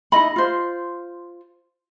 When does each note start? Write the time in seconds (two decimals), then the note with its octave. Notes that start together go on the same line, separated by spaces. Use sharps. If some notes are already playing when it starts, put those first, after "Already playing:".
0.12 D#4 E4 D#5 B5
0.36 F4 C5